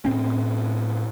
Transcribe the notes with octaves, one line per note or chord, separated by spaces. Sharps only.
A2 C4 C#4